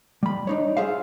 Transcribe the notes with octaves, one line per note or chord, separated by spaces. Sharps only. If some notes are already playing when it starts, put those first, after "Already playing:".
G3 B5
D4 D#4 C#5
F4 G#4 C5 E5 F5